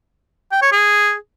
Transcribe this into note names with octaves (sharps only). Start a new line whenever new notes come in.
G5
C#5
G#4